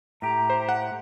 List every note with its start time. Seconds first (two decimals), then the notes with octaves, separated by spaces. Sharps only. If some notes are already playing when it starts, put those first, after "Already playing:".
0.22 A2 G4 A#5
0.50 C5
0.69 F#5